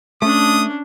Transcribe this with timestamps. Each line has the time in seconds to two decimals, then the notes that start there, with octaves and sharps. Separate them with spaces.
0.22 A3 C#4 D4 D#6